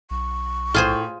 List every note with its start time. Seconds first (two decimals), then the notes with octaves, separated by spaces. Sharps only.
0.11 B1 C#6
0.74 A2 F4 G#4 C5 D#7